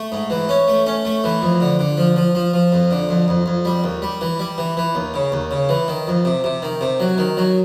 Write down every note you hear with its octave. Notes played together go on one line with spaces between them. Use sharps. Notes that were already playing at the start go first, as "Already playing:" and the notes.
Already playing: A3
G#2
E3
C#4
A3
C#4
A3
E3
F2
D3
D3
F3
F3
F3
F3
F2
D3
F2
F2
F2
G3
D#2
G3
E3
G3
E3
E3
D#2
C#3
D#2
C#3
E3
D#3
F2
C3
C3
D#3
C3
F#3
D#3
F#3